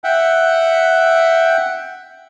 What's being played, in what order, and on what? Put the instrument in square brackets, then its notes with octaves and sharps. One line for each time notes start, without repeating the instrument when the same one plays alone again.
[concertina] E5 F#5 G5